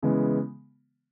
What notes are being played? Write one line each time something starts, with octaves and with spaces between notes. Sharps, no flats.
C#3 E3 G#3 B3